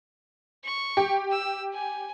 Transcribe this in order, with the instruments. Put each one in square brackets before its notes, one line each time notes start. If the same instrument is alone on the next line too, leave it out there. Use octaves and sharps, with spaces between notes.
[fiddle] C#6
[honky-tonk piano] G4
[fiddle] E6
G#5